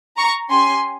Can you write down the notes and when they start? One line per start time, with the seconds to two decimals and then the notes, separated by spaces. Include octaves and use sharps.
0.18 A#5 C#6
0.49 C#4 G4 G#5 C6